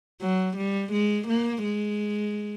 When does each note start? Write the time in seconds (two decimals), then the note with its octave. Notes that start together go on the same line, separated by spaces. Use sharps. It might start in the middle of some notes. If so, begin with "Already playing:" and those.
0.22 F#3
0.57 G3
0.93 G#3
1.28 A#3
1.64 G#3